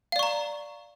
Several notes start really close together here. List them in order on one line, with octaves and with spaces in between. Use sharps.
F5 D5 C#6 A#5